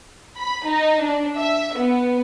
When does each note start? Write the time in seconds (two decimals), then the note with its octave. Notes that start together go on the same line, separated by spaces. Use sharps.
0.37 B5
0.66 D#4
1.03 D4
1.37 E5
1.77 B3